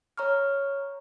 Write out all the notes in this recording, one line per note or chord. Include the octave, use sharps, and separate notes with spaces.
C#5 A#5 C#6 F6